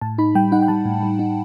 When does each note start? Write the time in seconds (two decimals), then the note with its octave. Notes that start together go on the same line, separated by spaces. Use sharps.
0.01 A2 A5
0.18 D#4 B5
0.35 G3 G5
0.52 D#4 F#5
0.62 G5
0.68 G3 A5
0.85 A2
1.03 G3
1.19 D#4